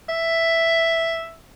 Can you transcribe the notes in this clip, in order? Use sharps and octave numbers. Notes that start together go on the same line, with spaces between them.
E5